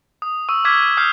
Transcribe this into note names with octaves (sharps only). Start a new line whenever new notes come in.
D#6
C#6 E6 D#7
D6 E6 F6 G#6 B6
D#6 F6 G6 C7